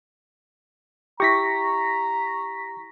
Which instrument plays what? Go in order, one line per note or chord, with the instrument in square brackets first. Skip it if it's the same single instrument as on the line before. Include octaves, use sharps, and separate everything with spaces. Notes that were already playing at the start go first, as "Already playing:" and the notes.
[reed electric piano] E4 G4 [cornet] A#5 [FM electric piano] C#6 A#6 B6